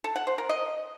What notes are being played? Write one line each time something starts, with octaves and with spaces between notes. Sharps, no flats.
A4
F#5
C5
A#4
D#5